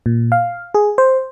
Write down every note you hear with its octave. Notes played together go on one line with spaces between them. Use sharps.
A#2
F5
G#4
C5